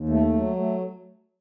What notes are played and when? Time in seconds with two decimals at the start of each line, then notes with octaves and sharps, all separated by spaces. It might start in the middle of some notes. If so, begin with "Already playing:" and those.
Already playing: D#2
0.09 A3
0.33 F#3
0.56 A3